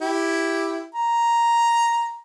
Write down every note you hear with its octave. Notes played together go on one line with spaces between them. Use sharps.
E4 G4
A#5